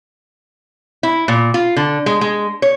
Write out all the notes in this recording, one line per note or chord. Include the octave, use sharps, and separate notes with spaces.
E4
A#2
F4
D3
G#3
G#3
C#5